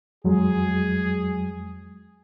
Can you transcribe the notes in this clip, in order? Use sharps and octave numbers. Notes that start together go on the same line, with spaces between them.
F2 F#3 G#3 G#4